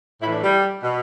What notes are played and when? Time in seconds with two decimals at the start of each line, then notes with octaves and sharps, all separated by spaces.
0.22 A2 E4
0.26 E3
0.32 D4
0.43 G3
0.83 B2